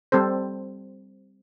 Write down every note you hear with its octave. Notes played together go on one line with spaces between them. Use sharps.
G3 C4 A4 C5